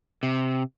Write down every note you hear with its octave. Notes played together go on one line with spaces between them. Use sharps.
C3